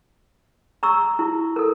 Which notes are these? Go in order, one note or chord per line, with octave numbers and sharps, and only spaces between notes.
A#5 C#6 E6
E4
A4 A#4